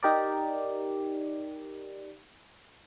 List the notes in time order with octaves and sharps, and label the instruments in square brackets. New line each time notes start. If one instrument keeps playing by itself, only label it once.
[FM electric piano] D#4 G4 A#4 D5